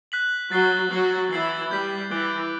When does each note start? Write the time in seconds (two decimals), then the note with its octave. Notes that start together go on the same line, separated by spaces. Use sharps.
0.12 F#6 B6 F#7
0.51 F#3 F#4 A6 C7 G7
0.91 F#3 F#4 F#6 C7 F#7
1.31 E3 E4 A6 C7 F#7
1.71 G3 G6 B6 F#7
2.11 E3 D6 F#6 A6 D7 G7